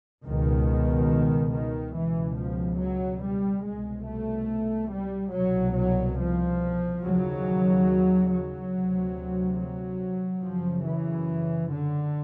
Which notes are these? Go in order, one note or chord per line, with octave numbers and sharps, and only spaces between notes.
C#2 B2 D#3
D#3
C#2 B2 E3
F3
F#3
G3
C2 B2 G#3
A3
G3
C2 B2 F#3
F#3
F3
D#2 C#3 F#3
F#3
D2 C3
F#3
F#2 C#3 F3
E3
D3